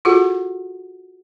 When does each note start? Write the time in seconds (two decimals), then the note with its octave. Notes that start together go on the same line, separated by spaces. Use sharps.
0.05 F4 F#4 G#4 A4 F#5